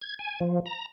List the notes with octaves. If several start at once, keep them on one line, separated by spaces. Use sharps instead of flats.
G#6
G#5
F3
A#5